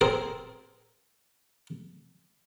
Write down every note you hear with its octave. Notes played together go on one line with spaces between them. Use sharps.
C4 G#4 A#4